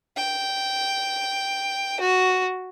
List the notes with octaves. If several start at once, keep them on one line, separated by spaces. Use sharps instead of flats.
G5
F#4